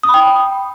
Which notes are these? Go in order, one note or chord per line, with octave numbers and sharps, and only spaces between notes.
D#6
B5
G5